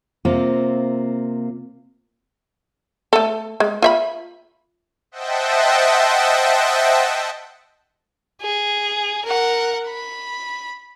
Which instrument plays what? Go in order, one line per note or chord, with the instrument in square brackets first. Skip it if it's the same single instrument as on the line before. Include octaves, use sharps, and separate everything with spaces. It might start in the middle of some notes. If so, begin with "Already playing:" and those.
[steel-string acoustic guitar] C3 A#3 C4 F4
[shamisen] A3 A4
G#3
F4 E5 B5
[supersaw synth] C5 D#5 E5 F#5 G5 A5
[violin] G#4
A#4 F#5
B5